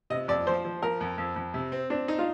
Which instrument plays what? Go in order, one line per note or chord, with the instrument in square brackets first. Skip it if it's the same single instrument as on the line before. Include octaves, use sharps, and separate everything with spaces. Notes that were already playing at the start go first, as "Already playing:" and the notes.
[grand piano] C3 [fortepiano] D#5
[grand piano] F2 [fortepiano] D5
[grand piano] F3 [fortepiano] C5
[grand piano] F3
[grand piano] F3 [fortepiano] A#4
[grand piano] F2
F2
F2
C3
C4
[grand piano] C4 [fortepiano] D4
[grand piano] D#4
[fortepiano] F4